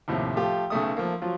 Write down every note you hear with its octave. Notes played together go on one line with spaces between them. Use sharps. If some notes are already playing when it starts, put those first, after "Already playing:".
D#2 A2 C3 F3
F3 A3 F4 G4
B1 C#3 A3 D#6
F3 A3 A#3
F3 F#3 F4